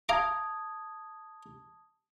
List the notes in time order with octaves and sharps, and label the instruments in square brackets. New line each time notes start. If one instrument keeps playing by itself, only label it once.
[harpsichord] F5 A#5 D6 [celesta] A5 D#6 G#6